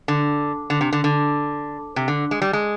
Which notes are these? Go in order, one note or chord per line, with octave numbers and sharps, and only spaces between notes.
D3
D3
C3
D3
D3
C3
D3
G#3
G3
G#3